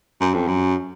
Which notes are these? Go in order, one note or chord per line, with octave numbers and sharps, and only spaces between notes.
F#2
F2
F#2